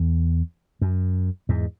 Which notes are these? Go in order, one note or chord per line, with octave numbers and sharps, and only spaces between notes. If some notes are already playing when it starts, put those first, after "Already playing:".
Already playing: E2
F#2
E2 G#2